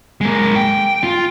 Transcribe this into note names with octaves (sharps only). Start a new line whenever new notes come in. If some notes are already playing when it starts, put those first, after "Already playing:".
G#3 A#3
G5
F4